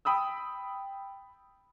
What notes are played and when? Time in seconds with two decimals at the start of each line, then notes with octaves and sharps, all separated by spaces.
0.05 G5 B5 D#6 E6